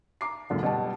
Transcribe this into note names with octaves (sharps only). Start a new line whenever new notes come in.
A#5 D6 C7
C#2 F#2 A#2 D3
B2 G3 A5